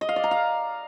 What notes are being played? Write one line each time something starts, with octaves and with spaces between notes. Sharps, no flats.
D#5
F5
D5
A#5
F5